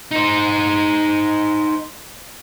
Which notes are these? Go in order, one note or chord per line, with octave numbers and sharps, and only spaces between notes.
D#4 C5